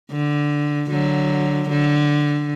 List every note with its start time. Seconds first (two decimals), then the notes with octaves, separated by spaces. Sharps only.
0.11 D3
0.90 D3 F#3
1.70 D3